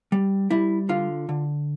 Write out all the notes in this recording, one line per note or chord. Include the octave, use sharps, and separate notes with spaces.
G3
G3 E4
D3 F4
D3